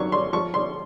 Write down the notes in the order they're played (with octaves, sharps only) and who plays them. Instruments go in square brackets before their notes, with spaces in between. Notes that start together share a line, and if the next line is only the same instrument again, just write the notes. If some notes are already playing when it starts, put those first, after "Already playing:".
Already playing: [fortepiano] D#3 F#3 C#6
C6
F3 C#6
C6